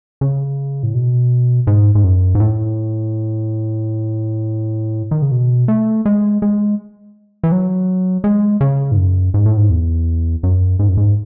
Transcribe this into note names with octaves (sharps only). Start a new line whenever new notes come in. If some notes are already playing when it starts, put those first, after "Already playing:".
C#3
A2
B2
G#2
G#2
F#2
G#2
A2
D#3
C#3
B2
A3
G#3
G#3
E3
F#3
G#3
C#3
G#2
F#2
G#2
A2
G#2
E2
F#2
G#2
F#2
G#2